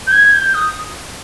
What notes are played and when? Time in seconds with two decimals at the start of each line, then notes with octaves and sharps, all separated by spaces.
0.07 G6
0.12 G#6
0.33 G6
0.54 D#6